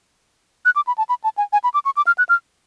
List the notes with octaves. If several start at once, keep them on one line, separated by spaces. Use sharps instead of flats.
F#6
D6
B5
A5
B5
A5
G#5
G#5
B5
D6
C#6
D6
F6
F#6
F6